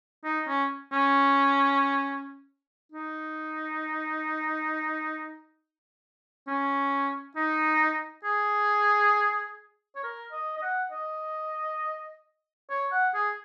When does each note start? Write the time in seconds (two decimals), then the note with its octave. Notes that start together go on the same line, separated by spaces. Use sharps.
0.24 D#4
0.48 C#4
0.92 C#4
2.92 D#4
6.47 C#4
7.36 D#4
8.24 G#4
9.96 C#5
10.03 A#4
10.32 D#5
10.57 D#5
10.62 F#5
10.91 D#5
12.70 C#5
12.92 F#5
13.14 G#4